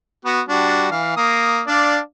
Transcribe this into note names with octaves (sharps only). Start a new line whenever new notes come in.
B3 F#4
G3 D4 F#4
E3 F5
A#3 D#6
D4 D5 F5